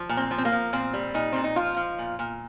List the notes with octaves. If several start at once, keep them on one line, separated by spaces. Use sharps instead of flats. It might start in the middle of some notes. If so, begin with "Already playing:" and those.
Already playing: F3
A#2
C4
F3
C4
A#3
F3
A#2 C4
G3
A#2 D#4
A#2 C4
D#4
F3 F4
F3
A#2
A#2